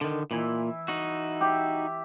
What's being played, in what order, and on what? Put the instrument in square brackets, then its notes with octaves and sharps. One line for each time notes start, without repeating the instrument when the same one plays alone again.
[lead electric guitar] D3 D#3
[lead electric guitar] A#2 [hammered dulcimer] E3 E4
[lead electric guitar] D#4 F#4
[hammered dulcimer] G4 E5